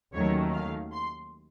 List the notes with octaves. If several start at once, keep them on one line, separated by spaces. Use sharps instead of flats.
D#2 D#3 F#3 A3 C#4 C#5
F5
C6